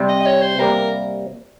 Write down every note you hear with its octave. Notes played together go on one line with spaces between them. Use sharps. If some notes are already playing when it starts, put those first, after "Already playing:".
Already playing: C3 G3 C4
D#5
D#5
C#5
C5
C3 G3 A#3 A#4